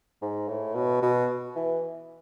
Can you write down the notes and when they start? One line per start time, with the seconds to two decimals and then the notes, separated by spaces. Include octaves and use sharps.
0.22 G#2
0.48 A2
0.75 B2
1.02 B2
1.56 E3